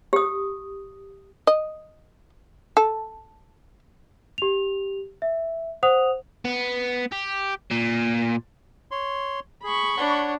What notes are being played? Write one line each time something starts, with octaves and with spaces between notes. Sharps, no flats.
G4 D#6
D#5
A4
G4 F7
E5
C5 F#5 D#6 F7
B3
G4
A#2
C#5 C6
G#4 B5 C#6
D4 C#5 F#5